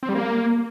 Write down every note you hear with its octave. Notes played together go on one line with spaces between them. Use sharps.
C4
G3
A#3